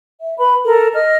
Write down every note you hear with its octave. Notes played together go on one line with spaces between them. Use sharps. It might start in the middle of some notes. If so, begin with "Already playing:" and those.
E5
B4 B5
A4 A#4
D#5 F6